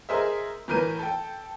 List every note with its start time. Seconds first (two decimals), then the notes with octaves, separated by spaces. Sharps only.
0.09 G#4 A#4 C5 D#5 E5
0.68 A2 E3 A#4 B4 G6 D#7
0.99 A4 G5